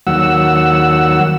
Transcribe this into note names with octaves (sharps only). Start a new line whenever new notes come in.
D#2 F#3 F#5 E6